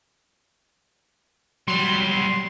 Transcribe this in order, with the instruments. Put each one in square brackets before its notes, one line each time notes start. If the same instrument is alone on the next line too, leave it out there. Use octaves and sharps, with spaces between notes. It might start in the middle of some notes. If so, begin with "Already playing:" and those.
[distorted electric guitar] F#3 G3 [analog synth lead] C6